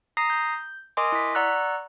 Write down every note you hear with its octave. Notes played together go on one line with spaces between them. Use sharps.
A#5 D#6 A#6 C7
G6
A#4 D#5 G#5 C6 D6 D#6
E4 B6
D5 F#5 A#5 C#6 E6 F#6